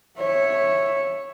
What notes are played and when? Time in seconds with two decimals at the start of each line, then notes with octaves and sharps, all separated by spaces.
0.18 C#5 E5